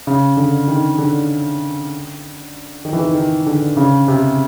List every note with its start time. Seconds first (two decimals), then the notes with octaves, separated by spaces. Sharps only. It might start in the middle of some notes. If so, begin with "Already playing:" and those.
0.07 C#3
0.37 D3
0.68 D#3
0.99 D3
2.85 D#3
2.93 E3
3.00 D#3
3.15 D#3
3.47 D3
3.77 C#3
4.08 C3